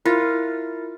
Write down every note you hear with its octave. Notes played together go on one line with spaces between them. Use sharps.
E4 F4 A#4 A6